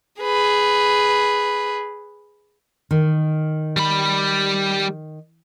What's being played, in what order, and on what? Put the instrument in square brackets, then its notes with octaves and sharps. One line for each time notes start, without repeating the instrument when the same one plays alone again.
[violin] G#4 B4
[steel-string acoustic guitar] D#3
[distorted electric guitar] G3 B5